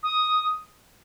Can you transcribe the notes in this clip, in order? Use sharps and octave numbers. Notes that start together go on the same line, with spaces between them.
D#6